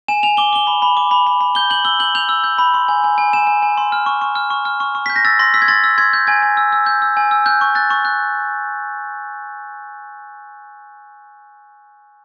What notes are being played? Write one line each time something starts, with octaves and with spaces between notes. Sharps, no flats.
G#5 E7
G#5 F7
D6 G7
D6 G7
B5
B5
D6
B5
B5
B5
G6 G7
G6 F#7
E6 G7
G6 F#7
G6 F7
E6
G6
B5
C6
G#5
G#5
G#5
G#5 E7
G#5
G#5
C6
F6
C#6
C#6
F6
C#6
F6
C#6
C#6
G6 B6
A#6
E6 A6
C6 A#6
E6 B6
G#6
C6 A6
E6
C6 G#6
G6
G#5 G#6
G#5
E6
E6
G6
E6
G#5
E6
F#6 G6
C#6
F#6 A6
C#6
F#6